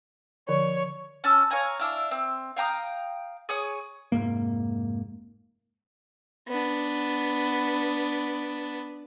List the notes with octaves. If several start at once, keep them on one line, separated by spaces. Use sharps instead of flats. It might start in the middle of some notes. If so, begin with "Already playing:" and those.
D3 F3 C#5
C#4 A5 E6
C#5 F5 G#5 A#5
D4 E4 F5
C4
F5 G5 A#5 D#6
G#4 C#5 D#6
F1 G#2 A#3
B3 D4